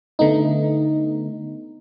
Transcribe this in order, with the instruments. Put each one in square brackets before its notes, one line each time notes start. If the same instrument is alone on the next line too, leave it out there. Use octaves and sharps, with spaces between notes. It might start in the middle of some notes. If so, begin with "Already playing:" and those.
[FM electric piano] D3 A3 B3 D#4